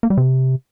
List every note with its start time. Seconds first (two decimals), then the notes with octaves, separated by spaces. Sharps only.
0.03 A#3
0.10 G3
0.17 C3